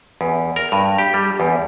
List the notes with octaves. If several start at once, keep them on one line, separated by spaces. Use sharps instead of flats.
E2
A#4
G2
G4
G3
E2